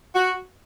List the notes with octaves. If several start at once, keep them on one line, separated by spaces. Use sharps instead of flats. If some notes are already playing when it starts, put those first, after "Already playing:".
F#4